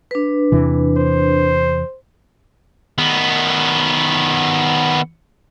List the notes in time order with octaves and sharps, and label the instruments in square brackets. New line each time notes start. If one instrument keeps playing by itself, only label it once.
[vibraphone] D4 B4
[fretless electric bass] E2 C3 E3
[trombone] C5
[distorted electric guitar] D#3 B3